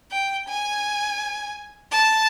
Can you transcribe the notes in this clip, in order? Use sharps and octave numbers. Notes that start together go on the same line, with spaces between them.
G5
G#5
A5